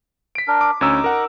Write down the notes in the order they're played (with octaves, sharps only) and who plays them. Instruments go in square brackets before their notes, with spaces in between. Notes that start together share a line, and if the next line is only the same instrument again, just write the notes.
[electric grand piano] B6 D7
[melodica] D4 A#4
[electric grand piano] D6
[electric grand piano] D2 C#4 E6 [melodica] D#4 D6
[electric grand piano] A#4 F#5